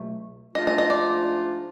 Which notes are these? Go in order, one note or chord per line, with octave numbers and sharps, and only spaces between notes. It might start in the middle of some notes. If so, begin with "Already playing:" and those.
Already playing: C#2 B2 F#3 A3
G#2 F3 A3 D4 F4 D#5
D#5
D#5
D5